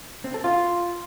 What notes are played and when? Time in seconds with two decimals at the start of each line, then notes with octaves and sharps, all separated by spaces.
0.24 C4
0.34 A4
0.44 F4